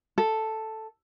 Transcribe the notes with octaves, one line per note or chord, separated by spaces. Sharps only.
A4